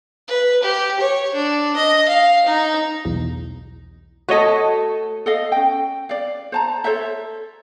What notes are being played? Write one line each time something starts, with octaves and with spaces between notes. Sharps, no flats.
B4
G4
C#5
D4
D#5
F5
D#4
B1 E2
A3 F#4 A4 C#5 D#5
A4 D#5 F5
C#4 G5
D5 F5
C5 A5 A#5
A4 C5 C#5 E5